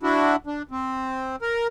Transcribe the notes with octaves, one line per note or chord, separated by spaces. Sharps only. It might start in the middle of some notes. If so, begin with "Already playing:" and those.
D4 E4 F#4
D4
C4
A#4